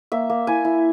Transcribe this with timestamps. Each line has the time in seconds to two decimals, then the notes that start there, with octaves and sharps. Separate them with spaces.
0.12 A#3 E5
0.30 A#3
0.47 E4 G#5
0.65 E4